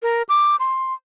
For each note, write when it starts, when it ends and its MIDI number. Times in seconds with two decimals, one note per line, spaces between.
0.03 0.22 70
0.29 0.56 86
0.60 0.93 84